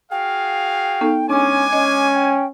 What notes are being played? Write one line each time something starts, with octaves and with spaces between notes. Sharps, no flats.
F#4 G#4 F5 G5
B3 D#4 A4
G#3 C#4 D4 G#5 D6
C#4 D#5
G5